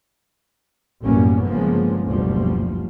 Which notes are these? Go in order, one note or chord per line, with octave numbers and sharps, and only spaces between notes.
A1 F#2 B2 G3 A#3 C#4
G1 C#3 F3 G#3 A#3 B3
F#1 D2 B2 F3 G3